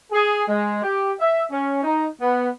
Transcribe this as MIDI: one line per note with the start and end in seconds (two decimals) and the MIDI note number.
0.11 0.42 68
0.48 0.80 56
0.82 1.12 67
1.20 1.42 76
1.51 1.80 61
1.83 2.07 63
2.20 2.48 59